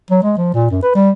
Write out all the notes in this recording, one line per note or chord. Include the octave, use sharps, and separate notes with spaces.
F#3
G#3
F3
A#2
F#2
B4
G3